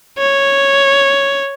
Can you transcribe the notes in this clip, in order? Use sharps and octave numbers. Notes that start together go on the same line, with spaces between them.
C#5